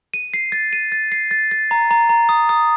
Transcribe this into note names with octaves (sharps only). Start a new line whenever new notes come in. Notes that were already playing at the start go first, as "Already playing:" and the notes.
D#7
C7
A6
D#7
A6
C7
A6
A6
A#5
A#5
A#5
D#6
D#6